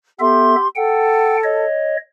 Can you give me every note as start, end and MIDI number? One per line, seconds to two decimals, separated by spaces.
0.20 0.56 59
0.20 0.67 67
0.20 0.56 69
0.20 0.56 76
0.20 0.67 84
0.75 1.65 69
0.75 1.37 78
0.75 1.37 79
1.44 1.97 73
1.44 1.97 75